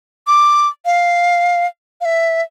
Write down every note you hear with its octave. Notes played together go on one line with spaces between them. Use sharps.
D6
F5
F5
E5